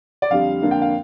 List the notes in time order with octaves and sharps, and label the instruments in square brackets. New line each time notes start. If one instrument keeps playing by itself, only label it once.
[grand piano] D5
[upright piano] F2 D3 G3 [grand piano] F5
[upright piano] F2 D3 A#3 D4
[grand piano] G5
F5